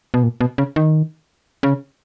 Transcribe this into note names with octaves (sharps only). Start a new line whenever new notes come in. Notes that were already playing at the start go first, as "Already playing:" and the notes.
B2
A#2
B2
C#3
D#3
C#3